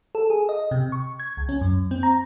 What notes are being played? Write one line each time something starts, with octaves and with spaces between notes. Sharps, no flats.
A4
G#4
D#5
C3
C#6
G#6
C#2
C#4
F#2
C4
A#5